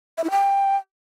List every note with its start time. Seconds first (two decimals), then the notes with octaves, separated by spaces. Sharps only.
0.18 E5
0.24 E4
0.31 G5